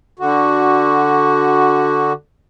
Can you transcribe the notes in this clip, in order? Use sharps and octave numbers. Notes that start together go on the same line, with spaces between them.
D3 F#4